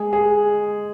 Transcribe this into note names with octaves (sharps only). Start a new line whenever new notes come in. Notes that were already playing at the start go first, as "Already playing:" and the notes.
Already playing: G#3 G#4
G#4